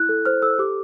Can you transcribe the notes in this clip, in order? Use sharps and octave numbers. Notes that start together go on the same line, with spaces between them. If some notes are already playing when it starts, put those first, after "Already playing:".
Already playing: E4 F#6
A4
C5 F6
A4 E6
G4 D6